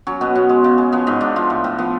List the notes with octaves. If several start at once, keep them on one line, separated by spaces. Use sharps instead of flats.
F#3 C#4
B2 B3
B2 C#4
G#3
C#3
G#3
F3 B3
G#2 B3
G#2 D4
F3 F4
A2
A2
F3 B3